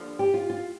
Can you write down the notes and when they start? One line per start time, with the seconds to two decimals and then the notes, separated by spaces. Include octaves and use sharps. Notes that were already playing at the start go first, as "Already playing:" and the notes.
Already playing: G2 D3 F3 A#3 D4
0.19 G4
0.34 F4
0.49 F4